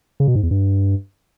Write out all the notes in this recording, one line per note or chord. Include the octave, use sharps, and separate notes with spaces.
C#3
B2
G#2
E2
G2